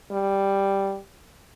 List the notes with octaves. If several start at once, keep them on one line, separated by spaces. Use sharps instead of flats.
G3